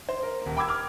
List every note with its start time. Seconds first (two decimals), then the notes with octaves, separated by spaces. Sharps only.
0.09 C5
0.23 A#4
0.42 D#1 A#3
0.57 G5 B5 D6 E6 G#6
0.69 D6 F6